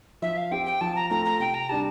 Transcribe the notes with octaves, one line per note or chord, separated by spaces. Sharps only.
F3 E5
F5
C4 G4 G5
G5
F3 A5
A#5
A3 C4 F4 A#5
A#5
C3 G5
A#5
G3 D4 G4 A5